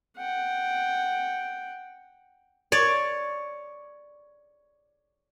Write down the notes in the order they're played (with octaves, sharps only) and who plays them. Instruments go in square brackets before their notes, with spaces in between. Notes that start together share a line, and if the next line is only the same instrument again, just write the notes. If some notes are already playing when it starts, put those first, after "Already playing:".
[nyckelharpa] F#5 G5
[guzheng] C#5 D5